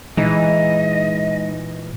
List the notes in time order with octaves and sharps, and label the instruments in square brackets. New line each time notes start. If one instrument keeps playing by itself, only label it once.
[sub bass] A#2 [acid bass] E3 [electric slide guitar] G#3 D#4 [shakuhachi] D#5